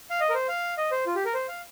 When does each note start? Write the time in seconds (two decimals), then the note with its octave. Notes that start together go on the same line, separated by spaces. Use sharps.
0.10 F5
0.20 D#5
0.30 A#4
0.34 C5
0.48 F5
0.78 D#5
0.92 C5
1.06 F4
1.15 G4
1.25 A#4
1.34 C5
1.48 F5